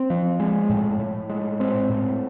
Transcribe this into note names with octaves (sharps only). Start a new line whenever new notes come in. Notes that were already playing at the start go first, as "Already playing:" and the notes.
Already playing: C4
F3
G#3
A2
A2
G#3
C4
A2